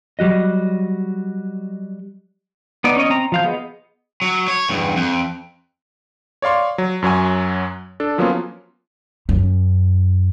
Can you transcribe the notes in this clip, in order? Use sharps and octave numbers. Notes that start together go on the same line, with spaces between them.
F#3 G3 F#4 D#5
B3 D#4 D5
C#4 C#5 D#5
C4 A#5
F3 F5 G6
B3 G#4 D#5
F#3
C#5
E2 G2
F2
C#5 D5 F5 C6 C#6
F#3
F#2 F#3 C#5 G#5
D4 A4
F3 F#3 A#3 B3 C#4 F4
F#2